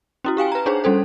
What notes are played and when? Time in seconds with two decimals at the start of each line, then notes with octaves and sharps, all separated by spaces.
0.24 C#4 E4 F#4
0.37 G4 F5 G5 G#5
0.52 B4 A#5
0.66 D4 D#4 G#4 C5 C#5
0.84 G3 C#4 A4 C5